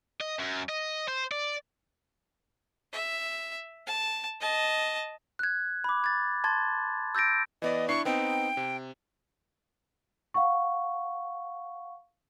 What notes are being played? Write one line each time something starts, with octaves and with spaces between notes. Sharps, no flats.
D#5
F#2
D#5
C5
D5
E5
A5
D#5 A5
F#6 G#6
B5 D6
G#6 A6
A5 C6 G#6 A6
E6 G6 A6 A#6 D7
E3 B3 D5 D#5
D4 E4 C#6 C7
B3 C4 D#4 G5
C3
F5 F#5 C#6